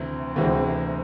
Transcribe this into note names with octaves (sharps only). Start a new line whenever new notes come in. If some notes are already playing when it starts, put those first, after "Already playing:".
Already playing: D2 C3 E3 C4
D2 C3 E3 G#3 C4